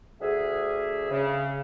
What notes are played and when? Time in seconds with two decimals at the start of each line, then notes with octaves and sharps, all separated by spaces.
0.21 D2 G#4 E5
1.10 C#3